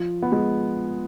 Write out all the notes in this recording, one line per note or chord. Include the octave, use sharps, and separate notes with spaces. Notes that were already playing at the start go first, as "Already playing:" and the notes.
Already playing: F3
B3
G#3